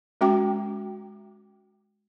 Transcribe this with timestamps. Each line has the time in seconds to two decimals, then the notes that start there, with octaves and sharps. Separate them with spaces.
0.21 G#3 C#4 F#4 G5 D6